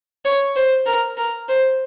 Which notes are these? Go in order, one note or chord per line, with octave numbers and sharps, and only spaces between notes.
C#5
C5
A#4
A#4
C5